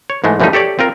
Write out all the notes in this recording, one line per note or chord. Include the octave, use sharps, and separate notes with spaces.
C#5
G#2 E3 G#3 A3
F#2 E3 F3 G3 A3 D#4
G4 A4 C#5 D5
C4 F4 A#4